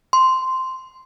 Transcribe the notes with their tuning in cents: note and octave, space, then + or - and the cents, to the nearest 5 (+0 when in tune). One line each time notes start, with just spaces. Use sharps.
C6 -5